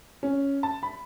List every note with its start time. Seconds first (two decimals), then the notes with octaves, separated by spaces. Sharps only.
0.23 C#4
0.63 A5
0.83 B5